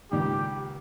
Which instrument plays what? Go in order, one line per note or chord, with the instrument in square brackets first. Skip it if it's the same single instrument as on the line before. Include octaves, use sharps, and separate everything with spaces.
[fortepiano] C#2 A#2 D#3 [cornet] G4